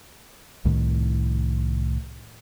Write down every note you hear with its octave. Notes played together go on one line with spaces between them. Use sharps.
C2 A2 D#3